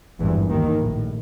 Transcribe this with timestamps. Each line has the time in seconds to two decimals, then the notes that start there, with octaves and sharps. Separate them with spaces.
0.19 G#1 E2 G2 E3
0.50 D#2 D#3
0.80 A#1 A2